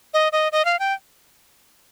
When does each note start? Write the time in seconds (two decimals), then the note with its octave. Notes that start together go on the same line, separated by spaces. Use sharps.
0.14 D#5
0.32 D#5
0.52 D#5
0.65 F5
0.79 G5